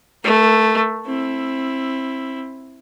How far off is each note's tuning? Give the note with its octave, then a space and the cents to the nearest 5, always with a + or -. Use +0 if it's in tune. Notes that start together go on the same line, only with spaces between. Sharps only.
A3 +0 A#4 +35
C4 +20 E4 +0